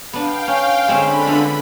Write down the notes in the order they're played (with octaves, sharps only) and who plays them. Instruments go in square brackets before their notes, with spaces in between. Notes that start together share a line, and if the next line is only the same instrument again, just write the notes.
[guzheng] B3 D4 [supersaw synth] F5 G5
[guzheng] C#4
[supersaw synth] D3 B5 [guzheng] G#3 C4 C#4
[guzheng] B3 F4 E5